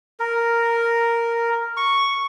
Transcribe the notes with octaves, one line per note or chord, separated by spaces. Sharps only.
A#4
C#6